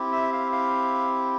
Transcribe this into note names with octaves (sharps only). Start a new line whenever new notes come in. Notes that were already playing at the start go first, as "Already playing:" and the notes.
Already playing: C4 E4 G4
E5
F5
F5